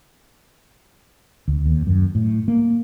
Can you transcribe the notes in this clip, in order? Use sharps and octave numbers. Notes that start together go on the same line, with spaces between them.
D2
D#2
F#2
A2
A#3